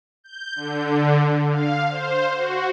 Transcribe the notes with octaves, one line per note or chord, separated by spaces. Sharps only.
G6
D3
F5
C5
F#4